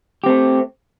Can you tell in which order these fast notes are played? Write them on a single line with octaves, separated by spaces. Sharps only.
G4 C4 A3